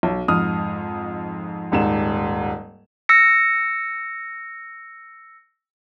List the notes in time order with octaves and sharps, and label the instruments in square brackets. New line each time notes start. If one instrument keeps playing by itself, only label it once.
[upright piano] B1
F2 G#2 D#6 F6
D#1 G#2 E7
[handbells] E6 A#6 C#7